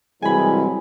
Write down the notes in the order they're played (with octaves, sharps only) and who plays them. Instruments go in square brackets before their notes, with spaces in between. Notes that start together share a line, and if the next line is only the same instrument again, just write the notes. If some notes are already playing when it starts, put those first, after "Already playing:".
[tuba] C2 [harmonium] E3 F#3 [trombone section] G#3 [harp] G#5 B5